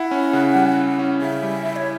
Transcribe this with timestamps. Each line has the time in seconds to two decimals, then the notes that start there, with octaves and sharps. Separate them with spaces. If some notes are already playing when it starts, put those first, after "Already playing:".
Already playing: E4 F#5
0.11 C#4
0.33 C#3
0.55 G3
0.78 E4
0.99 C#4
1.21 C#3 E5
1.43 G3
1.65 E4
1.76 C#5